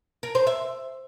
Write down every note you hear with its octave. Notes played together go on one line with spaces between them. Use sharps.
A#4
C5
E5